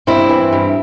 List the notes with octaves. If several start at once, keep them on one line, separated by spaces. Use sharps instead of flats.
G2 C4 E4
E3
G2